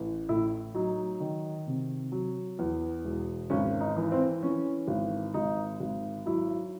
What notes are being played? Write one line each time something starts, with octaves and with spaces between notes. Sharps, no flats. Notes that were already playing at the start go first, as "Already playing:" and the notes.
Already playing: A1
A2 E4
F#3 D#4
D#3
C3
F#3
E2
E1
G#1 C#4
D#4
E3
C4
E3 C#4
G#1
G#1 D#4
G#1
F#3 E4